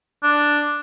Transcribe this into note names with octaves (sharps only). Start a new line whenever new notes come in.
D4